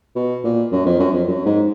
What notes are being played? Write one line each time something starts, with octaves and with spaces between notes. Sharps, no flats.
B2
A#2
F#2
F2
F#2
F2
F#2
G#2